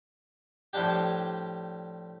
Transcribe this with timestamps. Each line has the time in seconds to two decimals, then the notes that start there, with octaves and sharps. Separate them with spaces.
0.73 A2 F3 G3 D4 G4